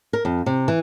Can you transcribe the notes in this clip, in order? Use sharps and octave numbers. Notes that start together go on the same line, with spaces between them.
A#4
F2
C3
E3